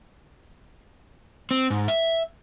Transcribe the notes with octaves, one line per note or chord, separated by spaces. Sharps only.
C4
G#2
E5